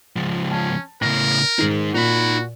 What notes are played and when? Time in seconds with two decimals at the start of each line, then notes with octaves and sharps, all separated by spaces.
0.16 C#2 F3
0.51 C#4 A5
1.02 A2 C#3 A#4 A#6
1.59 G#2 D#3 D#4 G#4
1.95 A#2 D#4 F#4 B5